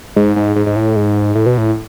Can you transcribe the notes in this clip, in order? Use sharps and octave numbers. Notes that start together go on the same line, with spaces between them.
G#2
G#2
G#2
G#2
A2
G#2
A2
B2
A2